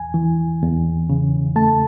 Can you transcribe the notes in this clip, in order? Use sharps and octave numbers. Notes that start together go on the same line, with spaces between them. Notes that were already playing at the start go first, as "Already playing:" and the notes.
Already playing: E2 G#5
E3
E2
C#3
A3 A5